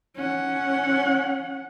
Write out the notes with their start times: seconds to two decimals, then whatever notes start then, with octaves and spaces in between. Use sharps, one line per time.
0.16 C#4 F#5